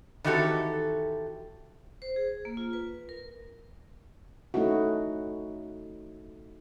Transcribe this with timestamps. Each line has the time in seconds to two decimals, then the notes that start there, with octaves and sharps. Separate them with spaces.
0.24 D#3 E3 C4 F#4 G4 A4
2.02 C5
2.16 G#4
2.45 A#3
2.57 F4
2.73 B4
3.09 A#4
4.54 A3 C#4 D#4 E4 F#4